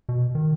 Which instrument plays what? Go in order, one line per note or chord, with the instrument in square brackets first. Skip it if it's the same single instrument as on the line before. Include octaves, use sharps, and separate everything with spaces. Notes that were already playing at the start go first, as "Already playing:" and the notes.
[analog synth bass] B2
D#3